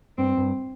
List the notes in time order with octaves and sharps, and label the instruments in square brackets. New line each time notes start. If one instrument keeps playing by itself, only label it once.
[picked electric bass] G2 [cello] C4
[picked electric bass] G2